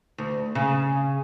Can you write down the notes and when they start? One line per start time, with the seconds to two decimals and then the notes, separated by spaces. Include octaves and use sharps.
0.18 D2
0.55 C#3